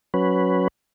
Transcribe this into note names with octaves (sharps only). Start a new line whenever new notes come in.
F#3 C#4 B4